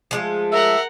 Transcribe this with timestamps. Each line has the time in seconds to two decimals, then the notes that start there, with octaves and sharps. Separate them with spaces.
0.11 F3 G#3 A3
0.52 A#4 E5 F#5